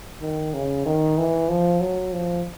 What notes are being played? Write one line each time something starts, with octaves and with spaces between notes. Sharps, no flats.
D#3
C#3
D#3
E3
F3
F#3
F3